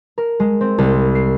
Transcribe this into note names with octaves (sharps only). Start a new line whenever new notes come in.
A#4
G#3
C4
C2
C7